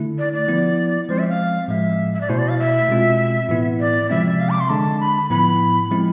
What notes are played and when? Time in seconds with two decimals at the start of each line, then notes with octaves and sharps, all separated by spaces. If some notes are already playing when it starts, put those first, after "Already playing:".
Already playing: D3 A3 E4
0.18 D5
0.33 D5
0.48 F3 B3 E4
1.09 F3 G#3 C4 C5
1.19 E5
1.29 F5
1.68 A2 F3 G#3 E5
2.13 E5
2.21 D5
2.29 B2 A3 E4 C5
2.38 D5
2.49 F5
2.59 E5
2.89 B2 G#3 C4 F4
3.49 A2 E3 B3 E4
3.80 D5
4.09 C3 F3 G#3 C4 E5
4.40 F5
4.50 D6
4.60 C6
4.69 D3 G#3 D4 A5
5.00 B5
5.30 A2 F3 B3 E4 B5
5.91 F3 G#3 C4 E4